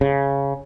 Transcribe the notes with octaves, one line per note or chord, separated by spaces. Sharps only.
C#3